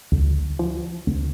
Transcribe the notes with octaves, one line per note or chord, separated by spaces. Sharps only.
D2
F3
D2